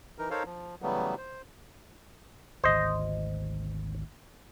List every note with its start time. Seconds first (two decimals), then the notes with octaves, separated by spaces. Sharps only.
0.18 E3 D#4 A#4
0.30 D#4 A4 A#4 C5 C#5 F5
0.45 F3
0.82 C#3 E3 F#3 G3 A3 B3
1.18 C5
2.64 G#1 D2 C5 D#5